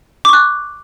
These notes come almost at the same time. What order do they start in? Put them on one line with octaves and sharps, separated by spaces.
D6 C#6 F#6